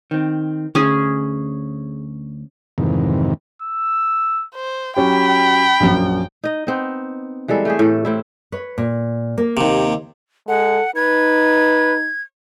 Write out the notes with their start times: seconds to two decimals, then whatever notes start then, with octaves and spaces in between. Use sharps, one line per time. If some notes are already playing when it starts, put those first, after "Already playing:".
0.11 D#3 C4
0.75 D2 C#4 G#4
2.78 F2 G#2 C3 D#3 E3
3.62 E6
4.55 C5
4.96 F#3 C#4 G4 G5 B5
5.80 A#1 F#2
6.43 D#4 D#5
6.67 B3 C4 D#4
7.48 E3 G3 G#3 A4
7.65 A3 G4 G#4
7.79 A2 A4
8.05 A2 C4 E4
8.52 B4 C#5
8.78 A#2
9.38 A#3
9.57 D#2 C3
10.48 G#3 A4 F#5
10.96 D#4 B4 G#6